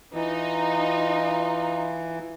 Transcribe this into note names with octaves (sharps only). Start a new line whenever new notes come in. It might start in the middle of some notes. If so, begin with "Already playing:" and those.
E3 D#4 F4